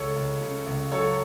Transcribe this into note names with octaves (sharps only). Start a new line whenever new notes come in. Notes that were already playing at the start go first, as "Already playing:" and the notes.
Already playing: C#2 A4 C#5
C#2
C#3
C#2
F#3 A4 C#5